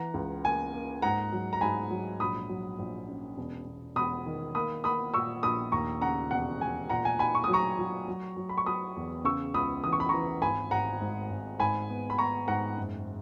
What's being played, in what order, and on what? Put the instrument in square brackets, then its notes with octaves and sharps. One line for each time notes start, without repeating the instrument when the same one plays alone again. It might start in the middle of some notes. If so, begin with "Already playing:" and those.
Already playing: [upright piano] E3 F#5 A#5
C#2
A#3 G#5
A#3
G#2 F#5 A#5
F#3
A#5
G#2 G#5 B5
F#3
A#1 B5 D#6
F#3
A#1
C#4
E1
E1
E1 B5 D#6
D#3
A#3 B5 D#6
A#3 B5 D#6
A#2 C#6 E6
A#1 B5 D#6
D#2 A#5 C#6
C#3 F#5 A#5
E1 F#5
E1 G#5
A#2 F#5 A#5
G#5
D#4 G#5 B5
C#6
F#3 D#6
A#5 C#6
F#3
F#3
F#3
B5
C#6
F#3 B5 D#6
E2
C#3 C#6 E6
C#2 B5 D#6
E3 D#6
C#6
B5
E3 A#5 C#6
G#1 G#5 B5
G#1 F#5 A#5
G#2
G#1
G#2 G#5 B5
B3
B5
B3 A#5 C#6
G#2 F#5 A#5
F#1